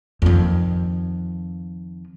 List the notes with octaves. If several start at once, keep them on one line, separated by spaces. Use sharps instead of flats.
F2 D#3